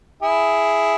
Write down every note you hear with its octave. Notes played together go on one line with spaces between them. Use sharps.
E4 G#4